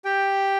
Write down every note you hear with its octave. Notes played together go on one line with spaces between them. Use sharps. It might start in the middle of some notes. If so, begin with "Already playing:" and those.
G4 G5